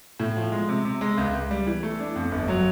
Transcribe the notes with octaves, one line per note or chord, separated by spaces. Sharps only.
A2
F3
G#3
C3
C3
G#3
C#2
C#2
G3
E3
A3
D4
F2
G1
F#3